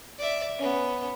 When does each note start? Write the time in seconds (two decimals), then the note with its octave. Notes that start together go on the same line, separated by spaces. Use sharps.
0.18 D5 E5
0.58 B3 C#4